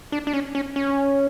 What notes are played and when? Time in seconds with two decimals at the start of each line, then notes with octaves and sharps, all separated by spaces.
0.12 D4
0.27 D4
0.33 C#4
0.55 C#4
0.76 C#4